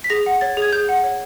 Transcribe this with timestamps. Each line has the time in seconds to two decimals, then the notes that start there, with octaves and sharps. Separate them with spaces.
0.04 B6
0.10 G#4 A#6
0.26 F#5
0.41 C#5 A6
0.57 G#4 G#6
0.72 G#4 G6
0.89 F#5
1.04 C#5